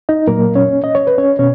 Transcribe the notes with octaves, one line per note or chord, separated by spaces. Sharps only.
D#4 D#5
A#2 F#3 A#3 A#4
C#4 C#5
D#5
C#5
B4
C#4 C#5
B2 C#4 C#5